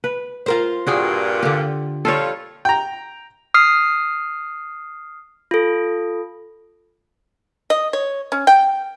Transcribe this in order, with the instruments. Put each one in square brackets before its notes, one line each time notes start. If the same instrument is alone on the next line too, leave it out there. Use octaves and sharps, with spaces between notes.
[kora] B4
[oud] F4 A#4 C5
[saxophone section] G2 A#2 [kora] F#4 G#4 G5
[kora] D3 G4
[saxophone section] F3 G3 F4 [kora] A4 C#5
[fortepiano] G5 A#5
[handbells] D#6 F6 C7
[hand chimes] F4 A4
[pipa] D#5
C#5
C#4
G5